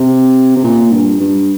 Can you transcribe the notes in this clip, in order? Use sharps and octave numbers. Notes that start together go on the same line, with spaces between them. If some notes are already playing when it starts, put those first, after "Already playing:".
Already playing: C3
C3
A#2
G2
G2